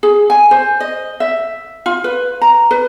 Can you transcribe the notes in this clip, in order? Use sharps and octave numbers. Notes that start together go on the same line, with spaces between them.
G#4
G#5
C5
D#5
E5
F4
B4
A#5
B4